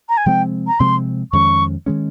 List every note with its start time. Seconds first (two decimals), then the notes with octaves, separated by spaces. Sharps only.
0.09 A#5
0.17 G#5
0.26 C3 F3 G#3 C4 G5
0.67 A#5
0.80 C3 F3 G#3 C4 C6
1.32 F2 D#3 G#3 C#4 C#6
1.86 D#3 G#3 C#4